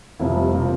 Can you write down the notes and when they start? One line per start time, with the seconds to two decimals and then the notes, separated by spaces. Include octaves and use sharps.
0.20 F1 F2 C3 F3 E4
0.36 G3
0.53 C3 F3 A#3